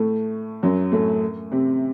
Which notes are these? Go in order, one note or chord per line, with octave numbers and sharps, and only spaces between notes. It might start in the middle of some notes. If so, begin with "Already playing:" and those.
Already playing: A2 A3
F#2 F#3
A2 A3
C3 C4